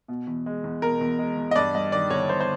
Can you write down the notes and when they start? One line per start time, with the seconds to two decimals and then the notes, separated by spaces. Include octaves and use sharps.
0.08 B2
0.27 E2
0.46 G#3
0.64 E2
0.82 B2 A#4
1.01 E2
1.19 G#3
1.37 E2
1.51 D#5
1.56 G2 D5
1.75 G3 D#5
1.92 D#3 D5
2.10 G1 C#5
2.29 G2 C5
2.41 C5